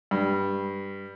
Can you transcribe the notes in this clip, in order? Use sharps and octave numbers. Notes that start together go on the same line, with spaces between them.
G2